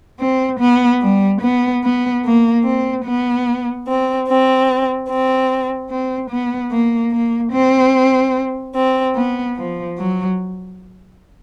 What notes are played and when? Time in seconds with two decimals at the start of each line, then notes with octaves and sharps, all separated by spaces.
0.20 C4
0.60 B3
1.01 G3
1.41 B3
1.82 B3
2.23 A#3
2.64 C4
3.04 B3
3.86 C4
4.27 C4
5.08 C4
5.89 C4
6.29 B3
6.71 A#3
7.11 A#3
7.52 C4
8.74 C4
9.15 B3
9.56 F3
9.97 F#3